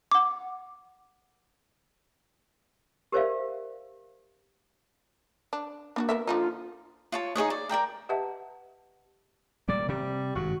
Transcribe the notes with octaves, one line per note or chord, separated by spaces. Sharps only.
F#5 D6
G4 A#4 C5 D5 E5 F5
D4
A#3 D4 E4 F#4
B3 A#4 E5
D3 F3 D#4 F4
F4 C#5 A5
D#4 G#4 C#5 D#5
D5
A#4 D5 G5 A#5
G4 B4 D#5 E5 F#5 A5
A#2 G3 A#3 D5
C3 G3
G#1 G2 F#4